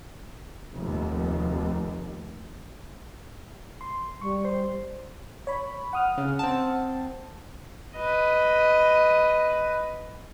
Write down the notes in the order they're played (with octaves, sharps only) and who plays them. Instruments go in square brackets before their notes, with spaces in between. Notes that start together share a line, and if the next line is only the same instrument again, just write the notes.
[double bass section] F1 D#2
[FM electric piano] C6
[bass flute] G3 [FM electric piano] C#6
[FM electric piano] C5 C6
C#5 B5
F#5 D#6 F6
[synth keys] C#3
C4 A5
[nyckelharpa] B4 D#5